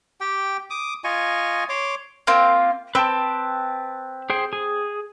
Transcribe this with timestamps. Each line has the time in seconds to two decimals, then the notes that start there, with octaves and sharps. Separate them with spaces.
0.21 G4 G5
0.70 D6 D#6
1.04 F4 D#5 G#5 C#6
1.69 C#5 C6 D6
2.27 A#3 C4 F4
2.95 C4 B4 G5 A5
4.30 G#4 C5 G5
4.53 G#4